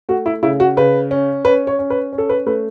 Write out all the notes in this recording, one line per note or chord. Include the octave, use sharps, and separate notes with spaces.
A3 F#4
E4
C#3 E4
F#4
C#3 B4
C#4
C#4 B4
C#5
C#4
B4
C#4
A4
B4
A3 B4